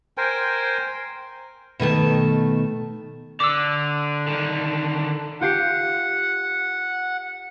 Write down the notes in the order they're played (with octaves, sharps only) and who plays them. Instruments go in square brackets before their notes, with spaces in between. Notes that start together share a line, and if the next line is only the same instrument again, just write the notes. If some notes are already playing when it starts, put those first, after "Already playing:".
[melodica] A#4 C5 G5 G#5
[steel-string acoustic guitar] B2 D#3 A3 A5
[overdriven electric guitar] D3 [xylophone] D6 E6
[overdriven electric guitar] D3 D#3
[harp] F4 G4 C7 [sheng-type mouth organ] F#5